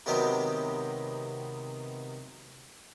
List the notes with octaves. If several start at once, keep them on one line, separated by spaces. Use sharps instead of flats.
C3 D#3 F#3 G#3 B3 G4